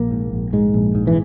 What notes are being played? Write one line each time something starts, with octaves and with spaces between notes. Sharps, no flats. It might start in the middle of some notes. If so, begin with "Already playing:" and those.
Already playing: A#1 A#3
G#2
A#1
G#2 G#3
A#1
G#2
E3